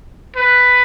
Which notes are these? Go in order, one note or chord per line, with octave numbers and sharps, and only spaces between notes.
B4